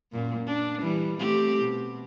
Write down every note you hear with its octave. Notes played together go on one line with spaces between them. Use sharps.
F#2 A#2
D4
E3 G3
A3 C4 G4
B2